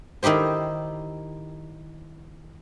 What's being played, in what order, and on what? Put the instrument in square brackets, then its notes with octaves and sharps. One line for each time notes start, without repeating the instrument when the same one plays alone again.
[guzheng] D#3 D#4 E4 G4 C5